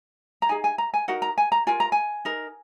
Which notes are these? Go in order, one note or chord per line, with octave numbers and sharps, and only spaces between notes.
A#5
D#4 G#4 G#5
G#5
A#5
G#5
D#4 F#4 A#4 F#5
A#5
G#5
A#5
F4 A#4 G#5
A#5
G#5
D#4 A#4